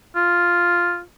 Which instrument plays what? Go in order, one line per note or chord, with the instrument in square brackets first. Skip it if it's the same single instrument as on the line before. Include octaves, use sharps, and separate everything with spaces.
[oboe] F4